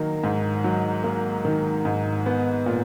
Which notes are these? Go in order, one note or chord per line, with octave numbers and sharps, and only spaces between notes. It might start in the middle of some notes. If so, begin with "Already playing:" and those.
Already playing: D#3 F#3 A#3
G#2
F#3
A#3
D#3
G#2
B3
A#2